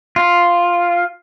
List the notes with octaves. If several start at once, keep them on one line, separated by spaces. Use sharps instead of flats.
F4